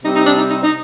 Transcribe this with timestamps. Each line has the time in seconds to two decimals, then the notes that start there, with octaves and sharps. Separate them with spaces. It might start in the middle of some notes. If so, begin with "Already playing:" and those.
0.04 C3 G3 C4 D#4
0.15 D#4
0.27 D4
0.37 D#4
0.48 D#4
0.62 D#4